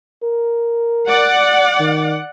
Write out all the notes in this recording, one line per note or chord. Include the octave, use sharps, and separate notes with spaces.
A#4
D5 F#5
D#3